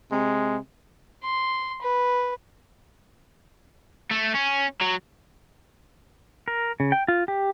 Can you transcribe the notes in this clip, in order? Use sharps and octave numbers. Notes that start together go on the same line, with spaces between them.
C3 G#3
C6
B4
A3
C#4
F#3
A#4
C#3
G5
F4
G4